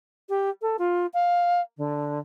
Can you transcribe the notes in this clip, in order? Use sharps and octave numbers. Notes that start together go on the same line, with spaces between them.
G4
A4
F4
F5
D3